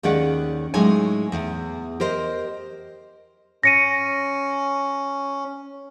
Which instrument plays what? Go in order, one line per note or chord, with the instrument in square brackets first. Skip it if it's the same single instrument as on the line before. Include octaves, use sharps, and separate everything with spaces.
[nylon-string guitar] D#2 D#3 C#4 G#4 D5 F#5
A2 F#3 G#3 D#4 C#5 G#5
E2
G4 A#4 C5 D#5
[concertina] C#4 [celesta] A#6 C#7 D#7